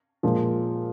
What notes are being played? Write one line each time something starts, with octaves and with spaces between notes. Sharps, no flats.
A#2 F3 G#3